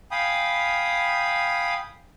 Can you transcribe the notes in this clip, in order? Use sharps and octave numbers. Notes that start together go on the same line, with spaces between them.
F5 G5 G#5 B5 D#6